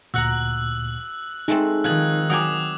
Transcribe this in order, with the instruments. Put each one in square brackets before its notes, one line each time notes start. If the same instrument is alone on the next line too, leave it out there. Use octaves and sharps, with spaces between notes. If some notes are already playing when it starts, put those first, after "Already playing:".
[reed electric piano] D2 A#2 [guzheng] F#4 F#5 A#5 [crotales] E6 F#6 F#7
[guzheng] G#3 A3 C4 [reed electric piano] D#4
[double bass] D#3 [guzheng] F3 [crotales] F#6 G#6 F#7
[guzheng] F#3 G5 G#5 [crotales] D6 D#6